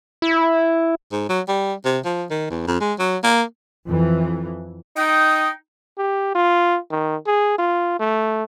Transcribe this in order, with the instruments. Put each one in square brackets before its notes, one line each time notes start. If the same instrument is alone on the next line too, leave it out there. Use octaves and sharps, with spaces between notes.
[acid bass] E4
[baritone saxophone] G#2
F#3
G3
C3
F3
D#3
E2
F2
G#3
F#3
A#3
[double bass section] F2 E3
[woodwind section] D#4 G5 D#6
[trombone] G4
F4
D#3
G#4
F4
A3